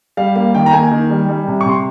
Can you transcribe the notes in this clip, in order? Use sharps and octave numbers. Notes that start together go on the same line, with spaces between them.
G3 F5
A#3 F5
D#3 G5
A#5
A#3 G#5
D#3
G3
G3
C3
C#6
C3 C6